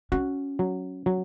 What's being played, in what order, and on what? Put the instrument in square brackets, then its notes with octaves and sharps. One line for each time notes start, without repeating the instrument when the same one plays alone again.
[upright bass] C#4 [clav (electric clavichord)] F#4
[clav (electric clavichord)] F#3
F#3